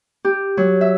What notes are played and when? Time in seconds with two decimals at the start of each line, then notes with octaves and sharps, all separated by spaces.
0.25 G4
0.57 F#3
0.81 E5